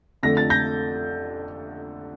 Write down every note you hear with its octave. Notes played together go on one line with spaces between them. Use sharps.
F2 D3 A3 A#6
A6
G6 A#6